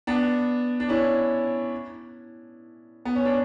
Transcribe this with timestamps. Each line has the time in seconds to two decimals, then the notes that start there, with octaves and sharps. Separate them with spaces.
0.07 B3 D4
0.80 D4
0.89 C#4 E4
3.05 B3
3.16 C#4
3.25 D4